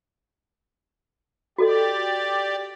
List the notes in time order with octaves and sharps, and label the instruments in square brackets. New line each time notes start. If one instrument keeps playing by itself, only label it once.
[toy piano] F#4 A4 D#5 [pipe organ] G4 D5